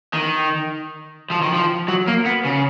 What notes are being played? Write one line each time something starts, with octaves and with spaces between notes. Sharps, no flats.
D#3
F3
D#3
F3
F#3
A#3
B3
C#3